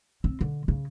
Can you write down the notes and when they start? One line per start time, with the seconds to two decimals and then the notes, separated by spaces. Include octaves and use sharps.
0.24 C4
0.41 D3
0.68 C#3